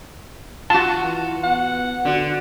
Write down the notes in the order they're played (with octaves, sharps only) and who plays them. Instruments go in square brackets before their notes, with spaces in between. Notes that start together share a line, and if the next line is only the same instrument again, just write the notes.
[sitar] F4 F#4 [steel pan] A5
[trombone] E3
[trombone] B3 [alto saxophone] F#5
[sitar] D3 [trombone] F#4